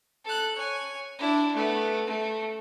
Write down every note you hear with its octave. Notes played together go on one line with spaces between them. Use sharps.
A4 F#6
C#5 G#5
D4 E4
A3 B3
A3